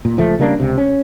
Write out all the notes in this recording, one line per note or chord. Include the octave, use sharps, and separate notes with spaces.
A#2
C#2 F3 A3
C#3 G3 A#3 D4
C#2 C3
C#4